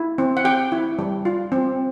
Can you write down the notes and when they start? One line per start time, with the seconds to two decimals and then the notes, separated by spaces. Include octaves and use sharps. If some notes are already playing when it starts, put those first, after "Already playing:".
Already playing: E4
0.18 C4
0.37 F#5
0.45 G4 G5
0.72 E4
0.99 G3
1.25 F4
1.52 C4